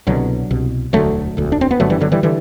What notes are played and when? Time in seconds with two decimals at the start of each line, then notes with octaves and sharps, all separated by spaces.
0.07 C2 B2 D3 F#3
0.51 C2 B2
0.93 E1 D2 D3 F#3 A3
1.37 E1 D2 D3
1.52 D4
1.61 C4
1.71 B3
1.80 G1 G2 D3 F#3 A3
1.90 E3 G3
2.00 D3 F#3
2.12 E3 G3
2.23 D3 E3 G3